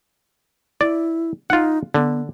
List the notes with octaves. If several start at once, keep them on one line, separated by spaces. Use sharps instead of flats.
E4 D5
D#4 F4 F#5
D3 B3